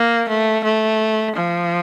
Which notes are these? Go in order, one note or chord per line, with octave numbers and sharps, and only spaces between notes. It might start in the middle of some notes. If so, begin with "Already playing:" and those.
Already playing: A#3
A3
A3
F3